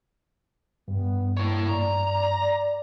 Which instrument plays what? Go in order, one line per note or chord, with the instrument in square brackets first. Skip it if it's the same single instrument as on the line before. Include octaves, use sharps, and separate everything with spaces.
[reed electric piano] G2 [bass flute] B3
[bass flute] A#3 [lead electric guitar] E4 C#5
[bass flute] D5 [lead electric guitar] A#5